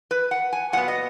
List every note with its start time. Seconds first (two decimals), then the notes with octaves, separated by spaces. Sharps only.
0.11 B4
0.31 F#5
0.53 G#5
0.73 A#2 F#3 B3 F#5
0.88 D#5